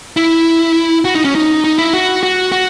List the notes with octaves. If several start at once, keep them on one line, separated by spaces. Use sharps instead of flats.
E4
F#4
D#4
C#4
D#4
D#4
E4
F#4
F#4
F#4